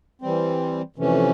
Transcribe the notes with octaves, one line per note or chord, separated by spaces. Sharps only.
E3 G3 C4
F2 C3 E3 A3 C#4